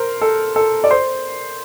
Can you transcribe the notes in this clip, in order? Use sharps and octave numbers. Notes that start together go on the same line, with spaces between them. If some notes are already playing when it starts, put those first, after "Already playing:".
Already playing: A#4 C5
A4
A4
D5
C5